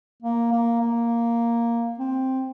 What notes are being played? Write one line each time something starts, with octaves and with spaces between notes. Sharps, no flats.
A#3
A#3
A#3
C4